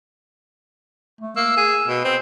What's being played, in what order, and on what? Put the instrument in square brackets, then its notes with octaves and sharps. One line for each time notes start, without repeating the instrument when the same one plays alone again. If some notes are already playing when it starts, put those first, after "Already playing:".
[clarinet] A3
[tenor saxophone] A#3 [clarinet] E6
[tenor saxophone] G#4
B2
C4